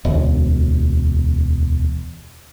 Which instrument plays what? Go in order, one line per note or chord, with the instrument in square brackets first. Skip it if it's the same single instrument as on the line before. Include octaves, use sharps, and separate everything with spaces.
[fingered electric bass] E1 D2